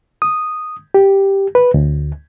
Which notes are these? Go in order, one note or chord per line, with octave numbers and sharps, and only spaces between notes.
D#6
G4
B4
D2